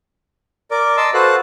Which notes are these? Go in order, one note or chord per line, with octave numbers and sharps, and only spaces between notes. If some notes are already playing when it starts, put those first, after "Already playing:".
A#4 D5 D6
D#5 A5 C6 D6 E6
F#4 A4 B4 C5 F5 F#5